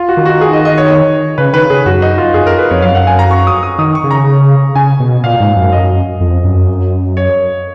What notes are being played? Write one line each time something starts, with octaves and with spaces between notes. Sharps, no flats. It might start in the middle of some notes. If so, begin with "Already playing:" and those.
Already playing: F4
F#4
D#3
F#4
G#4
D#5
D#5
C#5
C#3 B4
D#3 B4
C#3 G#4
F#2 F#4
D#4
F4
F#2 G#4
F#2 A#4
B4
F2 C#5
F#2 F5
F#5
G#5
A#5
C#6
D#6
D#6
D#3 D#6
C#6
C#3
A#5
C#3 G#5
B2
A#2 F5
G#2
F#2
D#5
F2
F#2
C#5